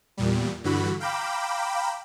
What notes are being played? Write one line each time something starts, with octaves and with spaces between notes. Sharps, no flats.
E2 A#2 G3
G2 D3 E3 F#4 B5
F5 G5 A#5 B5 D6 E7